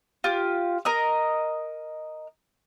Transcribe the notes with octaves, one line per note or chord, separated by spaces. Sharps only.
F4 G4
A#4 D#5 D#6